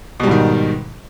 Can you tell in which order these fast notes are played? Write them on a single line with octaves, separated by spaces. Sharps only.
B2 G3 G#2 D#3